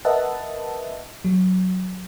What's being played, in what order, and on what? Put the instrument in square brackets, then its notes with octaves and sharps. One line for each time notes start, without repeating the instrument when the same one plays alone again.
[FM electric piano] A#4 B4 D#5 E5 F#5 A5
F#3